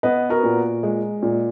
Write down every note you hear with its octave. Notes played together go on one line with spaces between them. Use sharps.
B3 B4 D#5
F#4 A#4
A#2
G#3
A#2